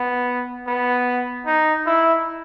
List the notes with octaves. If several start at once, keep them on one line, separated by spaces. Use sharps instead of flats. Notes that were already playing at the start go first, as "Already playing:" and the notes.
Already playing: B3
B3
D#4
E4